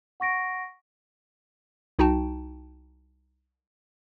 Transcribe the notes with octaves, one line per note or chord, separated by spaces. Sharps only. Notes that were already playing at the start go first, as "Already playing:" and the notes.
F#5 C#6 A#6 D7
C2 D#4 F#4 G5 A5